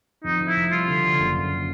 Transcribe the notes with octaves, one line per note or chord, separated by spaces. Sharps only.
F2 D#4
F2
E4
F1
G3 F4
D3
D3
F#1
F#1